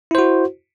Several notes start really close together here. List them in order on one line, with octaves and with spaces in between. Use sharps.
E4 C5 F#4